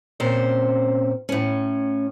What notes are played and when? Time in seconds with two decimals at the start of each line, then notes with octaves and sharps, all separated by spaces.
0.20 A#2 C4 C#4 C5
1.29 A2 C#4